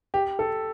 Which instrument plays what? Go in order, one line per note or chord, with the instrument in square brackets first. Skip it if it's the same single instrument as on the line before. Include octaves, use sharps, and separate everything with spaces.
[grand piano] G4
A4